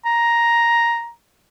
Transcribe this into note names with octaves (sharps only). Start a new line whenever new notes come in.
A#5